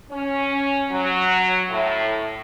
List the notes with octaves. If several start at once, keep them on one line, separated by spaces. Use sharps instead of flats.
C#4
F#3
A2